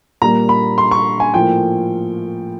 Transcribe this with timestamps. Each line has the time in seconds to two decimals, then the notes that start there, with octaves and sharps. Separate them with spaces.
0.22 A#2 G3 A#3 A#5
0.49 B5
0.78 C6
0.91 C#6
1.20 G#5
1.34 A2 F3 A#3 G5